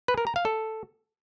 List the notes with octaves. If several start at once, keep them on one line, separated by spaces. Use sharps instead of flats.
B4
A#4
A#5
F5
A4